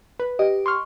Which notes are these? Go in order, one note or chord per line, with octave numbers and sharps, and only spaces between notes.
B4
G4 D#5
C6 C#6 F6